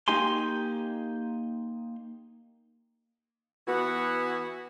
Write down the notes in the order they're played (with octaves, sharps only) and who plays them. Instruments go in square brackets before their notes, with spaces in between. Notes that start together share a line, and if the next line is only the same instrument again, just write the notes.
[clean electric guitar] A#3 D#4 G4 G#5 C6
[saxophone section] E3 B3 F#4